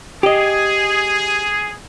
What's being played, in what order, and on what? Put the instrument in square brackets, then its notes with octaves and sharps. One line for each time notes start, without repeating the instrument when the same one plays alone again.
[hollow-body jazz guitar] G4 D#5 [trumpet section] G#4